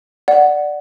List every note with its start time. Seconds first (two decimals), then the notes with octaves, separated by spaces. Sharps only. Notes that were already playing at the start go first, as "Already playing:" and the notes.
0.28 D5 F#5